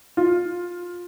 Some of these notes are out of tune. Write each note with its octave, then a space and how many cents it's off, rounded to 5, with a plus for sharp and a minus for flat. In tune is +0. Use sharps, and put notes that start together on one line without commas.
F4 +10